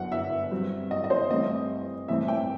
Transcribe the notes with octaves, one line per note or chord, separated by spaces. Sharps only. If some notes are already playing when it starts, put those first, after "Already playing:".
Already playing: G1 F#2 F#3 F#5
E5
G2 F#3 C4
D#5
D#5
C5
G2 E3 A3 C4 D#5
G2 E3 A3 C4 E5
G5